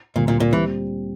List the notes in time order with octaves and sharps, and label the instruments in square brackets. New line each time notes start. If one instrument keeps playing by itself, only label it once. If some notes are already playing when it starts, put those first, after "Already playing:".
[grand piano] D2 D3 G3 C4 [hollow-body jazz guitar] A#2
[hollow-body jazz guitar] A#2
A#2
[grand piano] A#2 G3 C4 G4 [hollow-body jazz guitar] E3